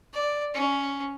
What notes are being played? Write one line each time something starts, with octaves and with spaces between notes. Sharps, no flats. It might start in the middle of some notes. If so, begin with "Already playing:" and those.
D5
C#4